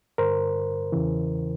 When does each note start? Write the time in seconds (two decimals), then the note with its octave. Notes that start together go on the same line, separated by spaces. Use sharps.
0.18 G2 D3 A#4 C5
0.92 E2 C#3 E3